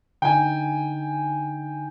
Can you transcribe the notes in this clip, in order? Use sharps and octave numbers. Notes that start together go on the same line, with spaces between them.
D3 D#4 G5 G#5